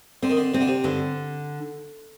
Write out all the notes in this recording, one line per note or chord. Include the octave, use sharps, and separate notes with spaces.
D3 C4
D#3
D3
C3 C4
D3
C3
G2 D3